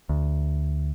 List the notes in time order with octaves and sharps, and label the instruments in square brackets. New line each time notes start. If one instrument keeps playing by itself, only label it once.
[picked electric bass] D2